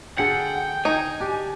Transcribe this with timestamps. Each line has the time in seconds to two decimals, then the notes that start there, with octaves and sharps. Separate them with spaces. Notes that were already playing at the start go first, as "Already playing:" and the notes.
0.18 D3 G#4 A4 F#5 G5
0.85 D#4 G#5
1.20 D4 G4